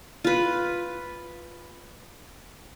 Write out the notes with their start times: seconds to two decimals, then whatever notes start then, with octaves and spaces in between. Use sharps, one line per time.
0.24 F4 B4